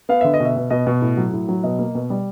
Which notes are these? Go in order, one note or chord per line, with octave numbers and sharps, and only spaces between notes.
B3 F5
D3 E5
D#5
B2 E5
B2
B2 D#5
B2
A2
F#3
A2
F#3
B2 D#5
A#3
B2
G3